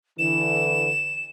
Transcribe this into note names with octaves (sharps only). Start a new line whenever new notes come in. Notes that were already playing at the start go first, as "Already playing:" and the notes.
D3 E3 E7